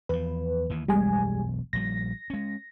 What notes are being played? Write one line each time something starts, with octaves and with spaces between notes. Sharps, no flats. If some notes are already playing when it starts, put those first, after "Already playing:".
E2 F3 B4
D#2 E3
E1 B1 F#2 G3 G#3 G#5
A#1 F3 G3 A#6
G#3 C#4